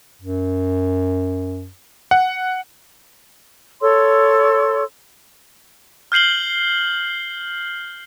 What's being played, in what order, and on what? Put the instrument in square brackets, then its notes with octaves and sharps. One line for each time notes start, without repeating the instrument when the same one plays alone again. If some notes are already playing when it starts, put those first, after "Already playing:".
[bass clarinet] F#2
[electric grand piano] F#5
[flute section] A4 C#5 C6 E6
[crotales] F6 G6 C7 F#7 G7